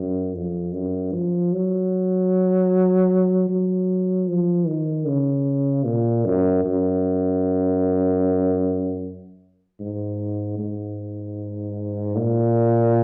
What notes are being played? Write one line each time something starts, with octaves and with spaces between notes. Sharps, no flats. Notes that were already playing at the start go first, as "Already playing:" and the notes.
Already playing: F#2
F2
F#2
F3
F#3
F#3
F3
D#3
C#3
A#2
F#2
F#2
G#2
G#2
A#2